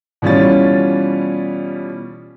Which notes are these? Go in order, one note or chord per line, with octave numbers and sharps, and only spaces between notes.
B2 E3 G3 C#4 F4 A6